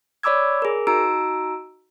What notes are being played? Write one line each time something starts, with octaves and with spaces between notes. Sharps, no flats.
C#5 D5 B5 D6 E6 G#6
G#4 A#4
D#4 F#4 A#5 E6 D7